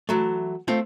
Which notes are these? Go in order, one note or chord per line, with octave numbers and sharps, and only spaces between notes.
E3 F#3 A3
A3 C4 F4